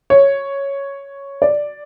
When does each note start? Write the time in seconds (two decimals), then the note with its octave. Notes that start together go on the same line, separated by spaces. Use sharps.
0.10 C#5
1.42 D5